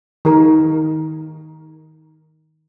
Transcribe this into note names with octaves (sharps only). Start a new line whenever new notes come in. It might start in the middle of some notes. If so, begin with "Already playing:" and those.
D#3 A#4